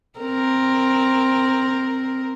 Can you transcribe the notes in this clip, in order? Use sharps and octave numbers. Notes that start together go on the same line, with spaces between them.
C4 A#4